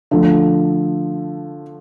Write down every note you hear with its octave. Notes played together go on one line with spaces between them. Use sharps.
D3 F3 A3